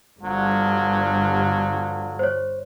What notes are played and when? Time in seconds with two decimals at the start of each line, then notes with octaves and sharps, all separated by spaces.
0.23 G1 D3 F3 F#3
2.19 C5 C#5